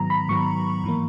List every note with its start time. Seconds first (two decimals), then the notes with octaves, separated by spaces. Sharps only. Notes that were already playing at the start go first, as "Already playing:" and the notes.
Already playing: G#2 D#3 F#3 B3 A#5
0.10 B5
0.29 G#2 D#3 F#3 B3 C#6
0.83 G#2 E3 A#3